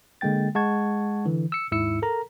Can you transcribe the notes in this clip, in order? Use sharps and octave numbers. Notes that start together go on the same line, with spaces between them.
D3 G#3 A#3 G5 A6
G#3 F#5 A5 C#6 G#6
D3 E3
E6 C#7
D#2 G#2 E4 E6 C#7
A4 A#4 A#5